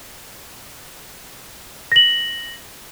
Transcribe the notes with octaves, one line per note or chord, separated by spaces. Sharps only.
A#6 F#7